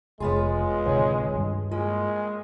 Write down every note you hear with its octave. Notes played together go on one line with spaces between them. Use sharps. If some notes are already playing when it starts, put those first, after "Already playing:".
F1 G#3 B3 F4 G#4 C#5 B5 C6
D1 C3 D#3 B4 C#5 F#5
G2
G#3 A#3 F4